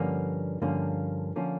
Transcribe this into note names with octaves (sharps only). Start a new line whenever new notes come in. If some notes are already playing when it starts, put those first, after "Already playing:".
Already playing: G2 D3 F3 A#3 C#4
G2 D3 F3 A#3 C#4
D3 F3 A#3 C#4